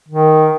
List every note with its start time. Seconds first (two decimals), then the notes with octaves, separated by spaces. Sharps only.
0.08 D#3